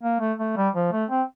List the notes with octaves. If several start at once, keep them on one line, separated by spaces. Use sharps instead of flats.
A#3
A3
A3
G3
F3
A3
C4